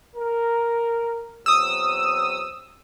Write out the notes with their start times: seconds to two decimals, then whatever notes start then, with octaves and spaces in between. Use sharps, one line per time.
0.16 A#4
1.46 E2 F#3 C4 D#6 E6